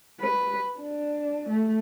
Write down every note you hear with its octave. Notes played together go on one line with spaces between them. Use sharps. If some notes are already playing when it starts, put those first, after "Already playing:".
B4
D4
A3